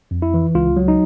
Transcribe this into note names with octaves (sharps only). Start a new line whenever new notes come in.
F2
E4
E3
C#2 F4
F#3
D#4